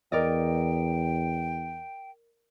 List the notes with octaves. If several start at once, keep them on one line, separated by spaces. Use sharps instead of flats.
E2 A#4 D5 D#5 G5